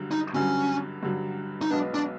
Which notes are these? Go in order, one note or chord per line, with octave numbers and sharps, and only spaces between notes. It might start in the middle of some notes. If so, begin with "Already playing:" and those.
Already playing: G2 D3 F#3
D#4
G2 D3 F#3 C#4
G2 D3 F#3
D#4
B1 B2 G#3 B3 D4
D4